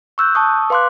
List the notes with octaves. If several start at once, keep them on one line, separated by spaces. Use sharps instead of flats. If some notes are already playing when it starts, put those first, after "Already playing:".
C#6 E6 F#6 G6
A5 C#6 D#6 E6
B4 F5 C6 D6 F#6